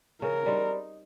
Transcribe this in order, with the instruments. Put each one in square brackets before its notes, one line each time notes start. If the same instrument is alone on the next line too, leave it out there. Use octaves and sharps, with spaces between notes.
[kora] C#3 [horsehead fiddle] A#4
[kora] G3 C4 D#4